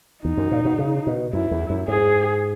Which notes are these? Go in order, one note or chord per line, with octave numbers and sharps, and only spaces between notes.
E2 D#4
F#2
A#2
B2
C#3
B2
F#2 E4
E2
F#2
G#2 G#4